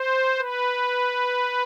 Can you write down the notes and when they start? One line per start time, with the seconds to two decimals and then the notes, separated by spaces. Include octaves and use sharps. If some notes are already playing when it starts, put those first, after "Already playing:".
Already playing: C5
0.38 B4